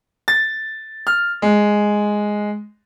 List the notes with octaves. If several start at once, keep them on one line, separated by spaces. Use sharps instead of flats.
A6
F6
G#3